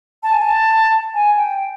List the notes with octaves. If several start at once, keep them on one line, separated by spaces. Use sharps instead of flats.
A5
G#5
A5
G#5
G5